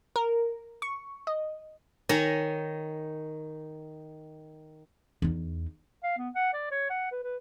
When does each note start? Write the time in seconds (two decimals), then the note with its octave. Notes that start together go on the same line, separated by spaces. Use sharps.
0.16 A#4
0.82 C#6
1.27 D#5
2.09 D#3 C#5 G#5 A#5
5.22 E2 D#4
6.03 F5
6.18 B3
6.35 F#5
6.53 D5
6.71 C#5
6.90 F#5
7.11 B4
7.23 B4